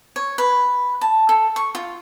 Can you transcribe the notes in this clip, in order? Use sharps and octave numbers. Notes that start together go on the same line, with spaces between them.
C#5
B4
A5
A4
C#6
F4